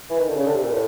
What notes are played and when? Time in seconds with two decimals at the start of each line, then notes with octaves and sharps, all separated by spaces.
0.10 E3
0.19 D#3
0.28 D3
0.36 C#3
0.46 D3
0.54 C3
0.64 A#2
0.72 A2